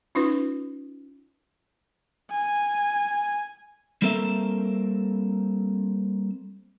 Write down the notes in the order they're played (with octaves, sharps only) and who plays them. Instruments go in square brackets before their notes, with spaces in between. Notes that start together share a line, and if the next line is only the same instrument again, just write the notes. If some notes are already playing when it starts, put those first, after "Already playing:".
[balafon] C#4 D#4 F4 B4
[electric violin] G#5
[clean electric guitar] G3 A#3 C4 A4 A#4 E5